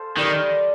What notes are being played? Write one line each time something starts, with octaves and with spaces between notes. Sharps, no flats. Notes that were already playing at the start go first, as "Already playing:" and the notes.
Already playing: A4 C5 F5
D#3 G3